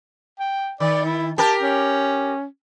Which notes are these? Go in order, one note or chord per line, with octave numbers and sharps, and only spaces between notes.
G5
D#3 D5
E4
G4 A#4 A5
C#4